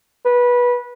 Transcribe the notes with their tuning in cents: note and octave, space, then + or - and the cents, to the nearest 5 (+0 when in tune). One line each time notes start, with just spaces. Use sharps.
B4 -20